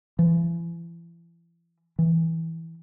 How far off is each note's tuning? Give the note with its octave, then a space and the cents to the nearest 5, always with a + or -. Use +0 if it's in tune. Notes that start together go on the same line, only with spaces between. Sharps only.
E3 +40
E3 -10